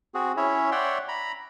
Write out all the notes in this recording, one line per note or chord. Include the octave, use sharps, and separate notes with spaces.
C4 F#4 G#4
C#4 E4 C#5 E5
C#5 D5 E5 F#5 G5 C6
A#5 B5